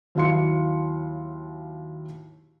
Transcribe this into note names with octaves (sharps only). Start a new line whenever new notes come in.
D#2 F#3 E4 F5 C6 C#7